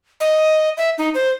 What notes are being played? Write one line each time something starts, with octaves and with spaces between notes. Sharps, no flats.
D#5
E5
D#4
C5